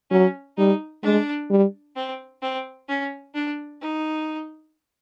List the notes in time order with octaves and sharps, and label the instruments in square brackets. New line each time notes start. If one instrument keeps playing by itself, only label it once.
[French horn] F#3 [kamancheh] C#4
[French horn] G3 [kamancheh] D#4
[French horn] G#3 [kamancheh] D4
[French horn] G3
[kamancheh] C4
C4
C#4
D4
D#4